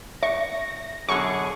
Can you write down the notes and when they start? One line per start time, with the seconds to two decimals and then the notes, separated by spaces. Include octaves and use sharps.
0.23 E5 C#6 A#6
1.09 F#2 B2 D3 G#4 C#6